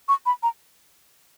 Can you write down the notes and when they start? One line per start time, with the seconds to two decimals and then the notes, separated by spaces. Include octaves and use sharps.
0.08 C#6
0.26 B5
0.43 A#5